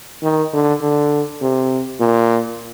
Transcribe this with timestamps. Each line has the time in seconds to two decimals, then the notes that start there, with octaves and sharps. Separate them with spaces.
0.23 D#3
0.53 D3
0.81 D3
1.41 C3
2.00 A#2